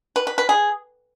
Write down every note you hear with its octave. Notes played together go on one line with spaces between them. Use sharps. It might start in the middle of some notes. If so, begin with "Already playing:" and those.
B4
B4
B4
G#4